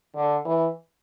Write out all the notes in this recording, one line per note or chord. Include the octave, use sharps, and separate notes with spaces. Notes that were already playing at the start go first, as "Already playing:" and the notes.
D3
E3